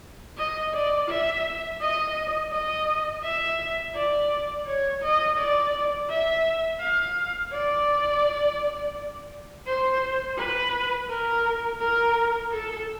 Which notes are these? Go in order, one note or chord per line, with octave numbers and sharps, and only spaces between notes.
D#5
D5
E5
D#5
D#5
E5
D5
C#5
D#5
D5
E5
F5
D5
C5
B4
A#4
A#4
A4